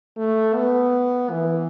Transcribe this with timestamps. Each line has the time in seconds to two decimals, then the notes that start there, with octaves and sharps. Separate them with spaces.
0.17 A3
0.55 B3
1.30 E3